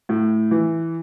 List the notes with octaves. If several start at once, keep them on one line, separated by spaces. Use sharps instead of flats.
A2
E3